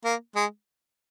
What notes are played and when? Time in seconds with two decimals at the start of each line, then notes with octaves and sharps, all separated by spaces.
0.05 A#3
0.35 G#3